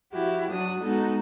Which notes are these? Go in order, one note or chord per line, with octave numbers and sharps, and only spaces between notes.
F3 E4 F#4 G4
F#3 D4 F#4 D#6
G#3 B3 D#4 F#4 A4